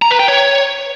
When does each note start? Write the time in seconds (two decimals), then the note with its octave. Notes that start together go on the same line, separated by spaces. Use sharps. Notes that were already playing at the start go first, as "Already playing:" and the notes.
0.02 A#5
0.11 B4
0.20 G5
0.28 C#5